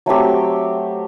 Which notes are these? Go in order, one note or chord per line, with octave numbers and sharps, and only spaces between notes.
F#3 A3 C4 G4